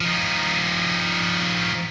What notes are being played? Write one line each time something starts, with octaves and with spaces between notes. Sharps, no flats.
F3 D#4